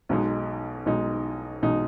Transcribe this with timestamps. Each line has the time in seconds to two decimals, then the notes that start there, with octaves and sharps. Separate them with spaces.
0.09 B1 B2 G#3 D#4
0.86 B1 B2 G#3 D#4
1.62 B1 B2 G#3 D#4